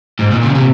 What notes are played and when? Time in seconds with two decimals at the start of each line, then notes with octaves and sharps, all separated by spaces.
0.19 G#2
0.31 A#2
0.43 C#3
0.55 C3